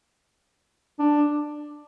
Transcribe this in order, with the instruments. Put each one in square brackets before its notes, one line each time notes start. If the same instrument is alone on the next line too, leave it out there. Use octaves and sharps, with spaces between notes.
[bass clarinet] D4